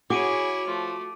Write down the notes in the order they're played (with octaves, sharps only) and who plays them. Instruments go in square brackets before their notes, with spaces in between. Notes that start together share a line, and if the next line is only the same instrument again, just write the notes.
[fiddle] E4 C#5 [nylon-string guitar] F#4 [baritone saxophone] G#4 [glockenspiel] D6 D7 D#7
[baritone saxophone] F3 [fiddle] A3